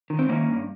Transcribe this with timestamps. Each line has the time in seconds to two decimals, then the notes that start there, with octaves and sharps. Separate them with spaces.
0.10 D#3
0.19 C4
0.28 D#3 A#3 C#4
0.48 G2